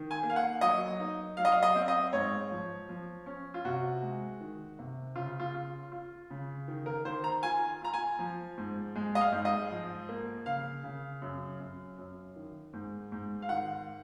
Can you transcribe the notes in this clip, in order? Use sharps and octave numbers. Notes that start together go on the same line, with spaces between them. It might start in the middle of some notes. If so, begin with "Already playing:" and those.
Already playing: D#3
G#5
A#3
F5
F#5
F#3 D#5
D#4
F#3 F5
D#5
F5
D#5
C4
D#5
G#2 C#5
F3
F3
C#4
F4
C3 F#4
G#3
D#3
C3
C#3 F4
F4
F4
F4
C#3
D#3
A#4
D#3 C5
A#5
F4 G#5
F4 A#5
G#5
F3
G#2
G#3
D#5
F5
G#2
D#5
F3
A#3
C#3 F5
C#3
F#2
F#2
F#2
D#3
G#2
G#2
F5
D#3 F#5